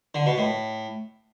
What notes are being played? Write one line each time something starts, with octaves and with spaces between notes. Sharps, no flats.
D3
B2
A2